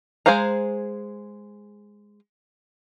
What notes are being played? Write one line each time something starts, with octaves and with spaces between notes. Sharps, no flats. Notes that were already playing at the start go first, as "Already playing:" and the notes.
G#3 G#4 C5 F5 A#5